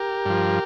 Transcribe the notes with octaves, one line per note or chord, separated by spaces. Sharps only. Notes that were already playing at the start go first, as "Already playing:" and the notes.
Already playing: G4 A#4
G2 F3